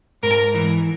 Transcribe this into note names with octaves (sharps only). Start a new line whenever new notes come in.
G#2 A#4
E3